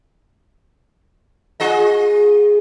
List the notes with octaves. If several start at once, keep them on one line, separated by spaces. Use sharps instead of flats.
F4 G#4 D#5